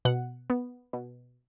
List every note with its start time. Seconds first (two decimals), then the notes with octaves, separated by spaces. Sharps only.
0.05 B2 F#5
0.50 B3
0.93 B2